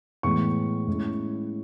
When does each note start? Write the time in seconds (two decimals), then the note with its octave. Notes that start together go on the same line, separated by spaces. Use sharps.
0.23 A2 E3 G#3 B3 C#6
0.87 A2 G#3 C#4 E4